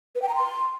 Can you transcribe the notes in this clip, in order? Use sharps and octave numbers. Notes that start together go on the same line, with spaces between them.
B4
G5
A#5
C6